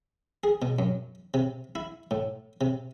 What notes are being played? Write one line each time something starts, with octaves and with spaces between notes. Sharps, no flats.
G#4
B2
F#2
C3
E4
A2
C3